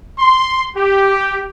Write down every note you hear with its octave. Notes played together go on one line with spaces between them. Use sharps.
C6
G4